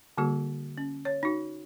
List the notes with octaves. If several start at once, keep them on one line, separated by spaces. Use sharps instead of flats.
D3 G3 A#3 F#4 G#4
C#4
C#5
D#4 F#4